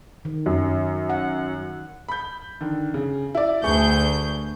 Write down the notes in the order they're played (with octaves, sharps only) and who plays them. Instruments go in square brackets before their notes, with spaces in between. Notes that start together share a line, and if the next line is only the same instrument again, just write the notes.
[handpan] D#3
[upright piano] F#2
[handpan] F#5
[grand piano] B5 G6
D3 D#3
C#3
E4 D5
[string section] D2 G6 [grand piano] G#4 B4 C#6